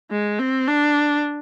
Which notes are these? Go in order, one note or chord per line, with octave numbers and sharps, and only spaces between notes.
G#3
C4
D4